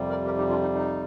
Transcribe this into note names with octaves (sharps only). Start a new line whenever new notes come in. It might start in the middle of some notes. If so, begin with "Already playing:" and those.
Already playing: F2 C3 G3
A#4 D5
G4 A#4
D#4 G4
D4 F4
D#4
D#4